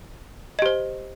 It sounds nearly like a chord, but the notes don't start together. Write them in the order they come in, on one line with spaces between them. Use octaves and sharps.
D#5 G4 C5